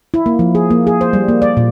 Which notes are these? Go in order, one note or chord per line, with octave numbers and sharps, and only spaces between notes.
E4
A#3
F3
G#4
A#3
G#4
C5
G3
A#3
D5
A#2